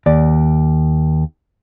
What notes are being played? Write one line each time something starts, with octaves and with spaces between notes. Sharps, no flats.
D#2 D5